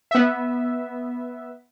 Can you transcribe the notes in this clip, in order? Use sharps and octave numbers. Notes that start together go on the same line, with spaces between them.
B3 E5